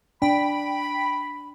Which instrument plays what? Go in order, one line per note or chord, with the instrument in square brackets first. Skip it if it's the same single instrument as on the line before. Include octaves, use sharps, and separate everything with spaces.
[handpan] D4 [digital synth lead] G5 [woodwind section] B5